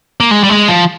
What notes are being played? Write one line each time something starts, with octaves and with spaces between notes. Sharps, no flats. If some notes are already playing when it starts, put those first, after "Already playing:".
A#3
G#3
G3
G#3
F3